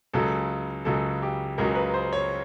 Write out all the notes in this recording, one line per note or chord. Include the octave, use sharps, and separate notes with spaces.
C#2 C#3 F#3 A4
C#2 C#3 F#3 A4
G4
C#2 C#3 F#3 A#4
B4
C5
C#5